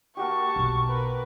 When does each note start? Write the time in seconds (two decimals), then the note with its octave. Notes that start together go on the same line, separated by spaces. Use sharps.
0.17 A#3 F#4 G4 A5 C#6
0.56 B1 B3
0.87 A#4 B4